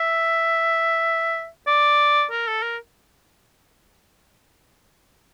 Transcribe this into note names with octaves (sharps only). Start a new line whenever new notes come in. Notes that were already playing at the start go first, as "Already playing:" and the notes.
Already playing: E5
D5
A#4
A4
A#4